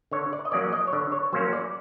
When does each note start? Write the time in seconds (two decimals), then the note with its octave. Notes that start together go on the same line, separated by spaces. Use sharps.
0.11 D3 C#5
0.33 D5
0.45 D#5
0.52 F#3 A#3 C#4 D5
0.72 D#5
0.87 C#5
0.93 D3 D5
1.12 C#5
1.33 F#3 A#3 C#4 C5
1.53 D5